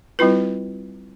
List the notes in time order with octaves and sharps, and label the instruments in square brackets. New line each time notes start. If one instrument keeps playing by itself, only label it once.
[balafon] G3 C4 E4 F4 B4